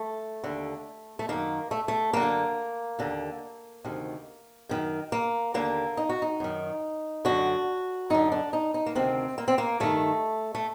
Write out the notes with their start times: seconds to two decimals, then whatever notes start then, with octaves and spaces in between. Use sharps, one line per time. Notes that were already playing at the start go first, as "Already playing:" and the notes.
Already playing: A3
0.44 D#2 D3
1.19 A3
1.29 F#2 D#3 A#3
1.71 A3
1.88 A3
2.13 F#2 D3 A#3
2.99 D#2 D3
3.84 D2 C3 D#3
4.69 F#2 D#3
5.12 A#3
5.54 D#2 D3 A#3
5.97 D#4
6.09 F#4
6.22 D#4
6.40 F#2 D#3
7.25 F#2 D3 F#4
8.10 F#2 D3 D#4
8.32 D4
8.53 D#4
8.74 D#4
8.86 A#3
8.95 D2 C3 D#3 C4
9.38 A#3
9.48 C4
9.58 A#3
9.80 G2 D#3 A3
10.55 A3